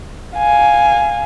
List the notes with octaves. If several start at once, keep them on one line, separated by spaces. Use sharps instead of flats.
F5 G#5